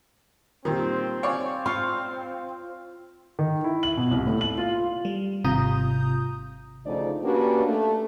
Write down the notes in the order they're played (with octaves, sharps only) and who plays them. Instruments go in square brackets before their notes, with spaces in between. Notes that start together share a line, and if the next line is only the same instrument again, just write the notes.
[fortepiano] A#2 D#3 [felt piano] G3 [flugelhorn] C4
[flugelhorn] C4 [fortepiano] C#5 D5 [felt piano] F5 G#5
[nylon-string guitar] F4 F5 [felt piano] C6 C#6
[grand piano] D#3
E4
F#7
B2
C2
A2
F#7
F4
[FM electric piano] G3
G#1 C3 F4 A#5 D#6 G6
[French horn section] D2 C#3 F3 A3 D#4 D5
A#3 C#4 D4 F#4 G4 B4
A3